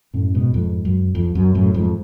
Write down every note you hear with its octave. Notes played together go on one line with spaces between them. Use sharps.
F#2 A2
G#2 B2
F2 G#2
F#2
F2
F#2
F#2 A2
F2 G#2